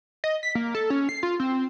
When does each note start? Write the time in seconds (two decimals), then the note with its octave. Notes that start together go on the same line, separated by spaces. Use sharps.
0.24 D#5
0.43 B6
0.55 A#3
0.75 A4
0.90 C#4
1.09 C7
1.23 F4
1.40 C4